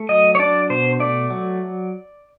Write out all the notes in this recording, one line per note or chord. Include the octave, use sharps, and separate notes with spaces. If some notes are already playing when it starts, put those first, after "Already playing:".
Already playing: A3
F#3 D#5
C#5
D4 D5
B2 C5
A3 D5
F#3